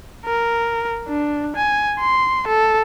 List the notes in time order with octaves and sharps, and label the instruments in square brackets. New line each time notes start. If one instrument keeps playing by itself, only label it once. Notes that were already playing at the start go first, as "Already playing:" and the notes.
[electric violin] A#4
D4
G#5
C6
A4